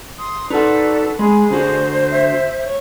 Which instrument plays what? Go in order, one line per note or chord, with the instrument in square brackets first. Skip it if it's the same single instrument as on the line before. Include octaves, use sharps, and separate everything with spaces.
[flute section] C6 D#6
[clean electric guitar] D#4 F#5 [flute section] F#4 A4 B4 [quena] D5
[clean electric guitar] G#3 [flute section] G#4 [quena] B5
[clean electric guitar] D3 F#4 [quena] C5
[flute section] E5
C#5